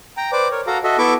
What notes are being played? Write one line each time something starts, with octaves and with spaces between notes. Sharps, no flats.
G5 A#5
B4 C5 D5 D6
A#4 C#5
F#4 A4 F5 A#5
F#4 A4 D#5 E5
B3 E4 A4 E5 C#6 D6